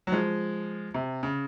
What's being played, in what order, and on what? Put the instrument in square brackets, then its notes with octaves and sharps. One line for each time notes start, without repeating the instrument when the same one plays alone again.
[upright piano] F#3
F3 G#3
C3
C#3